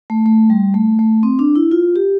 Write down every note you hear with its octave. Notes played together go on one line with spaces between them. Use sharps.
A3
A3
G3
A3
A3
C4
D4
E4
F4
G4